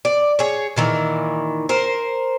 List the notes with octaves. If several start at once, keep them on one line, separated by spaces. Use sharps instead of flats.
D5
G#4 C#5
A#2 D#3 E3
A#4 C5